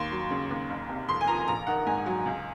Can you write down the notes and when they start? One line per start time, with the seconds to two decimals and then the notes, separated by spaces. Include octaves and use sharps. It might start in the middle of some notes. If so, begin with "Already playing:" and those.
Already playing: D#2 C6
0.11 F#3
0.30 C#3
0.50 D#2
0.70 F#1
0.89 C3
1.09 F2 C6
1.21 G#5
1.27 F3 A#5
1.48 A#1 A#5
1.67 D#3 F#5
1.87 G#2 G#5
2.06 F#3
2.25 C#2